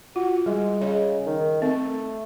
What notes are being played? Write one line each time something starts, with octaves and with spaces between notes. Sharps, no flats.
F4 F#4
G3 G#3
C#3 D#5
D#3
A3 C4